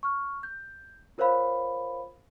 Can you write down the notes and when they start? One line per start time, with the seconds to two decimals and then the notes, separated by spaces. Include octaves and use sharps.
0.03 C#6 F6
0.43 G6
1.18 F4 A#4 C5 C#5 F5 B5